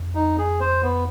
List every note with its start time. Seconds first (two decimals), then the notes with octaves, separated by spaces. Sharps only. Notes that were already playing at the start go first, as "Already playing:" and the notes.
Already playing: F2
0.15 D#4
0.38 G#4
0.60 C5
0.83 B3